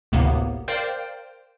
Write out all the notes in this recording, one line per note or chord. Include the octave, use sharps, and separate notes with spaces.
G#1 D2 A2 C3 A#3 B3
A#4 C5 D5 F5 G5